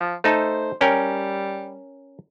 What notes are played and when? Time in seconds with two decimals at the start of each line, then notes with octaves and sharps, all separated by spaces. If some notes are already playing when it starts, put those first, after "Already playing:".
0.01 F3
0.24 A3 D#4 A4 C5
0.81 G3 C#4 A#4 G5